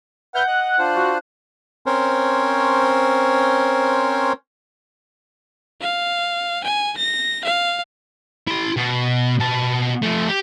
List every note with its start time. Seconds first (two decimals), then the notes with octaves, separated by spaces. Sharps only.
0.35 B4 E5 F#5 F6 G6
0.48 D#5 F#6
0.79 D4 F4 C5
0.96 F#4
1.86 C4 C#4 A#4 C5 C#5
5.81 F5
6.64 G#5
6.97 A#6
7.45 F5
8.48 E4 C6
8.77 B2
9.40 B2 A5
10.03 F3 A3
10.29 G4